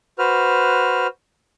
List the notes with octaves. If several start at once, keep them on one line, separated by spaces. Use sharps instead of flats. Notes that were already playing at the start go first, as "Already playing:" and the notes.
F#4 B4 C5 F6